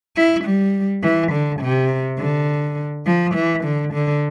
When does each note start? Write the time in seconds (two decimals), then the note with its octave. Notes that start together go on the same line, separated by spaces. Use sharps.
0.16 E4
0.45 G3
1.03 E3
1.32 D3
1.61 C3
2.19 D3
3.06 F3
3.35 E3
3.64 D3
3.93 D3